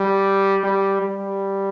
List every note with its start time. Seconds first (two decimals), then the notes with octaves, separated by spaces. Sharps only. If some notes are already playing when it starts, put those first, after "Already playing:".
Already playing: G3
0.64 G3
1.02 G3